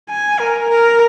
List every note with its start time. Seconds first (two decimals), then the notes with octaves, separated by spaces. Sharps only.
0.10 G#5
0.40 A#4
0.70 A#4